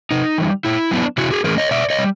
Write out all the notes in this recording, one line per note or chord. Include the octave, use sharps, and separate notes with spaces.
C3 D#4
E3 G3
A#2 E4
F#3 B3 D4
C3 E4 F#4
F#4 G#4
E3 A3 C#4 G#4 A#4
C#5 D#5
B2 D5 E5
C#5 D#5
G3